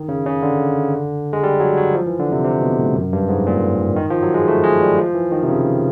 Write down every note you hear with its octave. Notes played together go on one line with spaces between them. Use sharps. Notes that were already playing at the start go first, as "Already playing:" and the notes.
Already playing: D#3
C#3
C#3
D3
G#3
G3
F#3
F#3
F3
E3
D3
C3
C3
B2
A2
F#2
G2
G#2
A#2
D#3
F3
F#3
G#3
A3
G#3
G3
F3
E3
D#3
C3
C#3